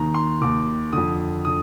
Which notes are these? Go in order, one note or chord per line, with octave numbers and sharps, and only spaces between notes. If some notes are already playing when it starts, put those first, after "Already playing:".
Already playing: D#2 D#3 A#5
C6
D#2 D#3 D6
F2 D3 D#6
D3 D#6